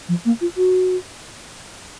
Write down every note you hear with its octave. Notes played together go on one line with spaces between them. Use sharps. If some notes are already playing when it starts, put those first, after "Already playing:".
F3
A#3
F4
F#4